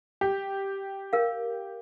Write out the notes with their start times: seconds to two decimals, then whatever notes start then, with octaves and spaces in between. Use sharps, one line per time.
0.21 G4
1.13 A#4 F5